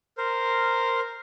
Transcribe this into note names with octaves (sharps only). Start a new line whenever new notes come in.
A#4 C5